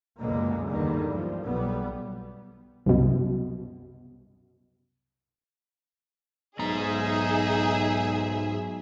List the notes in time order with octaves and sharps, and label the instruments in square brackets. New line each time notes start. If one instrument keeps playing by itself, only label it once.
[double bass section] C#2 F#2 B2 D3 G#3 A#3
E2 G2 D3 D#3 G3 A#3
F3
B1 G3 B3
[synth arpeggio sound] C2 F#2 B2
[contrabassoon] B1 [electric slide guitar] G#2 A#5 [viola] D#4 [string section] G#4 E5